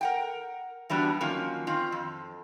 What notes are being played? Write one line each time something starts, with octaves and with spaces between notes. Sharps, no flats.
A#4 F#5 G5
E3 G3 B3 D4 F#4
D#3 F3 F#3 A#3 C#4
D#3 C4 F4
F2